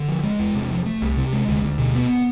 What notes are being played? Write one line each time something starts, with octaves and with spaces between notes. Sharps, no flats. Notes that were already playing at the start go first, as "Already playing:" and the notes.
Already playing: D3
F3
G#3
E2
C3
F3
A3
C2
C3
G#3
D2
D2
B2
B3